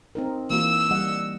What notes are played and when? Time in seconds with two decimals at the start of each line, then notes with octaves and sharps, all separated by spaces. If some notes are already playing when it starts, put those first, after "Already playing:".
0.15 C4 D#4 A#4
0.50 E3 A#3 F#4 E6
0.91 G3 D#5 F#5